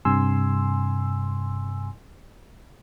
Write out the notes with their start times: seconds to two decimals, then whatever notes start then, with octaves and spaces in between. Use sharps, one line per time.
0.05 G2 C3 G#5 C6 E6